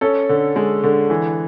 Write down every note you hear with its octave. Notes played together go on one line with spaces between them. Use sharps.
C#4 A4
D3
G#3
D3
E3